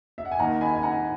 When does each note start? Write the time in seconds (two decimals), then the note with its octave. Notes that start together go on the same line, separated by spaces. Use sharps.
0.18 E5
0.25 F#5
0.31 G#5
0.39 D#2 D#3 A#3 F#5 A#5
0.61 G#5 B5
0.76 G#5
0.83 F#5 A#5